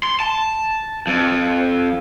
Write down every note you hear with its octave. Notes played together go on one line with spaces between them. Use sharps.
C6
A5
F2